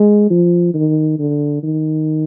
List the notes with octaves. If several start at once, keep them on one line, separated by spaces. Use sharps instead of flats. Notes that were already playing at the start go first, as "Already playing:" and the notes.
Already playing: G#3
F3
D#3
D3
D#3